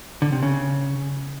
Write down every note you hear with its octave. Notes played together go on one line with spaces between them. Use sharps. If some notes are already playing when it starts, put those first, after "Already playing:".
D3
C3
C#3